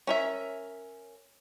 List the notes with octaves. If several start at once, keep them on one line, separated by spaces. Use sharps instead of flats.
C#4 A#4 E5